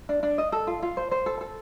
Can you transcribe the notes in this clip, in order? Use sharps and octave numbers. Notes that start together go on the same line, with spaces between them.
D4
D4
D#5
A4
F4
F4
C5
C5
A4
A4